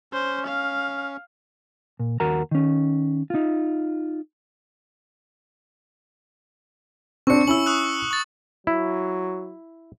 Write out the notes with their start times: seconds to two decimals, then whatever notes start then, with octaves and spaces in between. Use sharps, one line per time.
0.13 C#4 C5
0.47 F5
2.00 A#2
2.20 D#2 F#4 A#4 F#5 A#5
2.51 D#3 C#4
3.30 D#4 F4
7.27 C4 D4 C#6 C#7
7.47 C#4 E4 E6 F#7
7.66 C#6 D#6 F#6
8.11 C#6 A6
8.67 F#3 E4